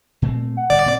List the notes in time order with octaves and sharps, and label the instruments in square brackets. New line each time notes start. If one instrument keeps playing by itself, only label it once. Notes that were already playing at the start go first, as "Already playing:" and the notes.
[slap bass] A#2 A3 C4
[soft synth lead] F#5
[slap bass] G1 A2 [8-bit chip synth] D5
[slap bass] A#2 C4